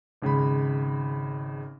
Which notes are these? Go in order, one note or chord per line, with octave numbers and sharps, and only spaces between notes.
G#1 C#3 G#3 B5